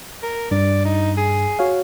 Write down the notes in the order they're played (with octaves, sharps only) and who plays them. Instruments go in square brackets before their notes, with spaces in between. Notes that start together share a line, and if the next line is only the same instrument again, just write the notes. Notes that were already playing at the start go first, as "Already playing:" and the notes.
[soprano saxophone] A#4
[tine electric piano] G2 [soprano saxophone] D5
[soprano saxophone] D#4
G#4
[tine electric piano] F#4 C#5 F5